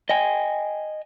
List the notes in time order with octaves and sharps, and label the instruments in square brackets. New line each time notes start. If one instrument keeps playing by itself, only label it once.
[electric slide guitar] D#5 G5 G#5